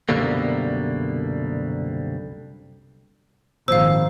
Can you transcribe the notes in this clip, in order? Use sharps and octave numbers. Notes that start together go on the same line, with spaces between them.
C2 F#2 B2 D3 G3 A#3
G#1 A#2 F3 C5 F5 E6